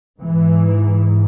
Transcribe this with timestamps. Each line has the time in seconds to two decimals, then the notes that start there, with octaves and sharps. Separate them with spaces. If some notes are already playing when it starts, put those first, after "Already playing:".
0.20 G#2 E3